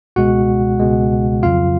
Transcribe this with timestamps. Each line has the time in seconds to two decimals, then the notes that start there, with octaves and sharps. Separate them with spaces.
0.16 C#2 B2 G#3 F#4 F#5
0.80 C#2 B2 G#3
1.43 F2 C#3 F#3 F4 F5